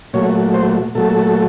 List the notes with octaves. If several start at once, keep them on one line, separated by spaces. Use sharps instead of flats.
A#2 F#3 A3 C#5
C5
A#2 F#3 A3 A4